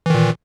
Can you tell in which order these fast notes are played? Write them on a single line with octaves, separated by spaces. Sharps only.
E3 D#3 A#2